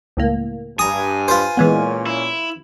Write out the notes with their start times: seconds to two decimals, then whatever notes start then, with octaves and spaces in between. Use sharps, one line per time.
0.17 C#2 A2 A#3
0.79 G2 G#5 A#5 D#6
1.28 F4 B4 C5
1.57 A#2 E3 G#3 B3 C#4
2.07 E4